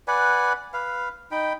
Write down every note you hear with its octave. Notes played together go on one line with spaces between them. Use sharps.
B4 D5 F#5 G#5
B4 F5
D#4 G5 B5